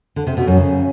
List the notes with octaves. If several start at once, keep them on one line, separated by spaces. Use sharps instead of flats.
D3
C3
B2
F#2
C#3